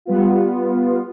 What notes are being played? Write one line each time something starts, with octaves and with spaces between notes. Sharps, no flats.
G3 B3 F4